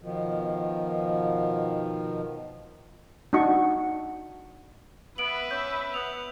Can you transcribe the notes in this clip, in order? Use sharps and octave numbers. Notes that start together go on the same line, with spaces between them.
B2 D#3 F3
D4 D#4 F#4 C#6
B3 B4 E5 D7 F#7
C#4 G6
B3 F7